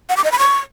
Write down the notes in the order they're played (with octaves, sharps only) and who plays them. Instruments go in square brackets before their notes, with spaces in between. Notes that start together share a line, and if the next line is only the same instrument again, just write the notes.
[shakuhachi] F#5
D6
D#5
B5
C#6